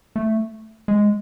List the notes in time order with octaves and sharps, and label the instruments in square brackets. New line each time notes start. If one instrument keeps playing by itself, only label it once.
[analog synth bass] A3
G#3